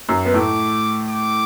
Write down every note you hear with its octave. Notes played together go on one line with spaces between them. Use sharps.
F#2 F#3
B3
A2 A3 D6
D6